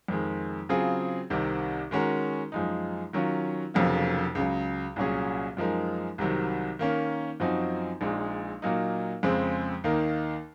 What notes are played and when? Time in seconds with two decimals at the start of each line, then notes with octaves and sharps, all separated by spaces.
0.08 F2 D#3 G#3
0.69 C#3 F#3 C4 F4 G#4
1.30 C2 C3 D#3
1.91 D#3 G#3 C#4 F#4 A#4
2.52 F#2 F3 G#3 D#4
3.13 D#3 F#3 C#4 F4
3.74 F1 F2 C#3 F#3 A#3
4.35 C#2 C#3 F#3
4.96 C2 A#2 F#3 C#4 G#4
5.57 F#2 F3 G#3 D#4 A#4
6.18 C2 C3 D#3 F#3
6.79 D#3 A#3 C#4
7.40 F#2 F3 C4 D#4 F#4
8.01 A#1 A#2 G#3 D#4
8.62 A#2 F#3 A#3 D#4
9.23 F2 C#3 G#3 C4
9.84 D#2 D#3 A#3 D#4 A#4